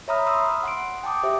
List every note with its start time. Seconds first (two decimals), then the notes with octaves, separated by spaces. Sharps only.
0.08 C#5 E5 A#5 B5 D#6 F6
0.27 B5 C6 D#6 E6
0.63 F#5 C6 D7
1.03 G5 A5 D6 D#6
1.23 G4 C5 E5 G5